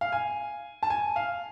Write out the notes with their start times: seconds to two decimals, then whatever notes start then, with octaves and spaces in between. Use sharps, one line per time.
0.01 F5
0.12 G#5
0.83 A5
0.90 G#5
1.16 F5